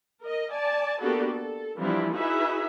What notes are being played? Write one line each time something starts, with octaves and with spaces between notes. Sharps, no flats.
A#4 D#5
D5 G#5 A5
A#3 B3 D4 F#4 G4 A4
A4
E3 F3 G3 C4 D4 E4
D#4 E4 F#4 G#4 B4 E5